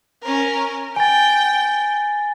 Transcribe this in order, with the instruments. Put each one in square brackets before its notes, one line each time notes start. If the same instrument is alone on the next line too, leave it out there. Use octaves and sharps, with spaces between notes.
[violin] C#4 A#4
[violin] G5 [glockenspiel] G#5 A6